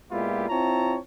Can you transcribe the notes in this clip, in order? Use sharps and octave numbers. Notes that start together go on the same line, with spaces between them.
A#2 G#3 B3 E4 F4 G4
C4 E4 F4 C#5 A5 A#5